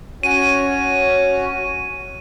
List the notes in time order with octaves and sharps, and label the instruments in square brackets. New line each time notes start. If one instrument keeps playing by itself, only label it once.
[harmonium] C#4 F#4 C#5 [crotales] D#7